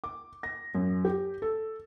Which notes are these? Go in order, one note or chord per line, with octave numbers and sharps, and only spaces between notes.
D6
A#6
F#2
G4
A4